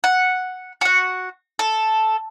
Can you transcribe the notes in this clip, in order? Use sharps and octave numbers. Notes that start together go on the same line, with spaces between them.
F#5
F#4 F#5
A4